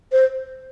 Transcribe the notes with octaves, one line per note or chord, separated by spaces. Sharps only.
C5